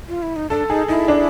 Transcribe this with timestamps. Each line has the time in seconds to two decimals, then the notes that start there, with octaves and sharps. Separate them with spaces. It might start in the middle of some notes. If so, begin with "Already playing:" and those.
0.08 F4
0.22 E4
0.36 D#4
0.50 D4 A4
0.69 D#4 G#4
0.88 D#4 E4
1.08 D4